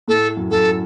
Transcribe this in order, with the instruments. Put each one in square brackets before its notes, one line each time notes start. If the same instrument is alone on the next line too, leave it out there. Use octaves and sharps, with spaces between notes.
[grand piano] A2 [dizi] A4
[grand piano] F#2
[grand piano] F#2 [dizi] A4